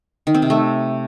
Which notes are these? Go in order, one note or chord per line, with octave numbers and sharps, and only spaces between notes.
D#3
C4
C3
A3